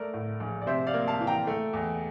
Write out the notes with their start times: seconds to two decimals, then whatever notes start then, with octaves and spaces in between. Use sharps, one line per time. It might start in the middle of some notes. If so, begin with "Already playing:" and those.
Already playing: A3 A#4 D5
0.14 A2
0.40 A#1
0.61 D5
0.66 C3 C5 E5
0.87 D5 F5
0.94 A#3
1.08 F5 A5
1.21 E3
1.27 G5 A#5
1.47 A3
1.73 E2